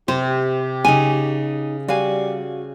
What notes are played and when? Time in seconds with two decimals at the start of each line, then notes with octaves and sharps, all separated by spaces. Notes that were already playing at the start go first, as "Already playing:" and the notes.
0.08 C3 G4 C5
0.85 C#3 D#4 G#5
1.88 G3 F#4 F5 G#5